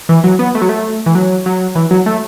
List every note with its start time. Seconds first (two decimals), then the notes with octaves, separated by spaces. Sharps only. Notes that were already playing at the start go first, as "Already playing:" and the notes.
0.09 E3
0.24 F#3
0.39 B3
0.55 A3
0.62 F#3
0.69 A3
1.06 E3
1.15 F#3
1.46 F#3
1.75 E3
1.91 F#3
2.06 A3